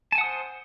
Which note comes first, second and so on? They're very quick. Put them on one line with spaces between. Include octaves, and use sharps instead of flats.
A5 G#5 F#5 D#6 C5